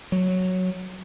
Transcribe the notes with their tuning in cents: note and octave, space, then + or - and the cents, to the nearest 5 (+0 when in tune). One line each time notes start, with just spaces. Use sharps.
F#3 -5